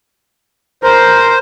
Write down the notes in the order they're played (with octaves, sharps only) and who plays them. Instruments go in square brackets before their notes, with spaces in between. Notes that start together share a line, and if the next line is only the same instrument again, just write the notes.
[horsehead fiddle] A#4 [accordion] C5